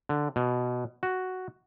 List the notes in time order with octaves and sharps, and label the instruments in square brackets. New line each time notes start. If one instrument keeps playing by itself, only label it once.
[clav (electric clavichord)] D3
B2
F#4